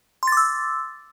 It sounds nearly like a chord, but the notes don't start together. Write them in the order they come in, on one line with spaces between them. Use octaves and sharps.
C6 A6 D6 E6